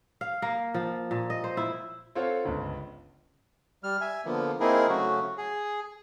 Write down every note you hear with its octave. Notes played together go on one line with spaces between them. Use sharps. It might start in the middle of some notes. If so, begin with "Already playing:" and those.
F5
A#3
F3
A#2
D#5
C5
E4
C4 F4 A4 C#5 F5 F#5
G1 C#2
G3 F6
E5 G#5
D3 F3 A#3 B3
A#3 C4 D#4 E4 G#4 A#4
C#3 F#3 A3 C#4 F#4
G#4